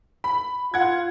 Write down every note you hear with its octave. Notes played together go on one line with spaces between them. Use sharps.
B5
F4 F#5 G#6